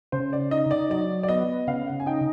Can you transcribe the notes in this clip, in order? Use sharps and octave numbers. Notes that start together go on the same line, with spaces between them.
C#3 C5
D5
D#4 D#5
D5
F#3 D5
D5
B3 D#5
C#3 F5
F#5
G#5
D#4 G5